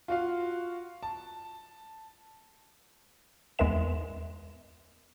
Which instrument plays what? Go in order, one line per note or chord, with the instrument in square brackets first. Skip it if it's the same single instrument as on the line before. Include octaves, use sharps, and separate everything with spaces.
[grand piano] F4 F#4 F5
A5
[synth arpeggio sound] E2 G#3 A#4 B4 E5 E7